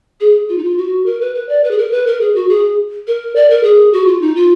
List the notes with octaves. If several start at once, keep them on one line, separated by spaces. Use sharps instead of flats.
G#4
F4
D#4
F4
F#4
A#4
B4
B4
D5
B4
G#4
A#4
B4
A#4
G#4
F#4
G#4
A#4
D5
A#4
G#4
F#4
F4
D#4
F4